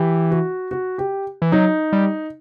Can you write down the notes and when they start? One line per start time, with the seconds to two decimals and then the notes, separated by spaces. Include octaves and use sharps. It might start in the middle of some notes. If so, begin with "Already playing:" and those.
Already playing: E3 G4
0.31 F#4
0.71 F#4
0.98 G4
1.42 E3
1.52 F#3 D#4
1.93 G3